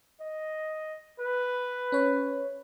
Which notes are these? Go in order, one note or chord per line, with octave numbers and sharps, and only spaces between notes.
D#5
B4
C#4 C#5